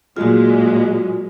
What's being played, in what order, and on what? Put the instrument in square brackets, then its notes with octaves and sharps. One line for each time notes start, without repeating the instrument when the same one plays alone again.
[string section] A#2 F#3 G#3 [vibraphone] F4 F#4